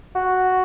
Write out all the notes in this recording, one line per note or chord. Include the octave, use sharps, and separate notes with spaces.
F#4